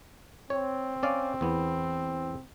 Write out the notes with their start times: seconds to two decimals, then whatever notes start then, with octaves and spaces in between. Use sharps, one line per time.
0.50 C4 C#5
1.03 C#4 D5 F5
1.41 E2 B3